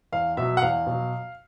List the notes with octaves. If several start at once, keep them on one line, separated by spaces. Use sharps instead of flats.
E2 F5
B2 F#3 E5
F#5
E2 F5
B2 F#3